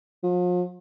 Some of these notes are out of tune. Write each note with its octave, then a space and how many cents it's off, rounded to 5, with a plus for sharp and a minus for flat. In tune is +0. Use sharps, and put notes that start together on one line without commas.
F3 +40